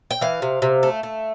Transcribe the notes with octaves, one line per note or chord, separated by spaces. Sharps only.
G5
E3 F5
C3
C3
A3
A3